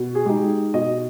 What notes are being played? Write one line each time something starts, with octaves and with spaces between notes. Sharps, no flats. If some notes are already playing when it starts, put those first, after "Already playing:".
Already playing: B2
G#4
G#3 D#4 G4
B2 D#5